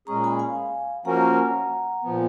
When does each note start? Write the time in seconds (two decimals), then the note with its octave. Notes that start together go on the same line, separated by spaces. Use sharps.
0.07 A#2 G#3 C#4 G#4 A#5 C#6
0.24 G#5 B5
0.39 F5 G#5
1.05 F3 A#3 C#4 F#4 A#4 F#5 A#5
2.03 A#2 F3 B3